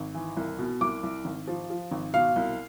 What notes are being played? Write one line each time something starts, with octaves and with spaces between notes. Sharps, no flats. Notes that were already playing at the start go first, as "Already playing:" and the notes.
Already playing: G#1
E3
C2
B2
C2 D6
C2
G#1
F3
F3
G#1
B2 F5
C2